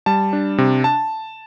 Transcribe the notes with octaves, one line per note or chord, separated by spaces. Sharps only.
G3 A5
D4
C3
A5